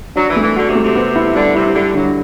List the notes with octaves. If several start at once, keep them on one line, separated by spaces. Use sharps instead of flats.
F#3 D4
E3
A3
E3
D3 F#4
C3
A3
C3
B3
E4
D3 G3
C3 E4
D3 G3
D3 F#3